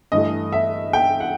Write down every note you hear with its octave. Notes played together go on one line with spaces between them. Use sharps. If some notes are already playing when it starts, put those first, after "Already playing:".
G2 E3 A3 D#5
E5
G5
F#5